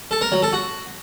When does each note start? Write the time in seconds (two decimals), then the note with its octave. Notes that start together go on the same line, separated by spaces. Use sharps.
0.11 A4
0.21 A#4
0.32 F#3
0.42 A4
0.53 F#4